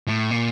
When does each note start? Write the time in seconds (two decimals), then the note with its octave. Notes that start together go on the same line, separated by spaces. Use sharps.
0.07 A2
0.31 A#2